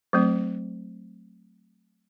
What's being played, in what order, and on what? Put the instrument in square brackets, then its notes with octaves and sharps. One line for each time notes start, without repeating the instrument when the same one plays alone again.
[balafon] F#3 A3 C4